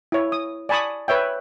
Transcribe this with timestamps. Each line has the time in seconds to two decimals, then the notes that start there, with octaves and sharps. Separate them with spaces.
0.12 E4 C#5
0.32 D#6
0.69 D5 G#5 A5 B5 C#6 D#6
1.08 B4 C#5 E5 G5